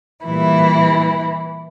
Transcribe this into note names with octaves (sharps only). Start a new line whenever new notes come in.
A#2 E3 G3 E4